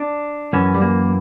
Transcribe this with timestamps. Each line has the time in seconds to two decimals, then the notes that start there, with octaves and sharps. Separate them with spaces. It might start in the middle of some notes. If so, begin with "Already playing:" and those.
Already playing: D4
0.53 F#2 E3 C#4
0.74 G3
0.81 A#3